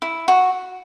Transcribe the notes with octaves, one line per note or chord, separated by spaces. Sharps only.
E4
F#4